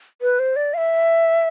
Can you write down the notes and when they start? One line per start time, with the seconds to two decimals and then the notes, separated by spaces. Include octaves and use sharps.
0.22 B4
0.39 C5
0.56 D5
0.74 F5
0.78 E5